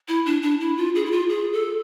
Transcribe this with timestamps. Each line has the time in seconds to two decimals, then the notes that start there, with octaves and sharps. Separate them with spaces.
0.08 E4
0.26 D4
0.42 D4
0.61 E4
0.78 F4
0.95 G#4
1.06 E4
1.11 F4
1.29 G#4
1.53 A4